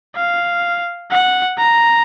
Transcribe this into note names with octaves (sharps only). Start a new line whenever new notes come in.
F5
F#5
A#5